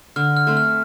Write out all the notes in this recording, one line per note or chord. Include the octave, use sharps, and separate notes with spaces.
D3 F6
F6
A3 C4
F6